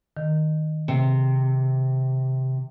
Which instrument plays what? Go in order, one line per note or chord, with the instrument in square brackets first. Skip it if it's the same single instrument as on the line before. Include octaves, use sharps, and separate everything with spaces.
[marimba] D#3
[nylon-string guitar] C3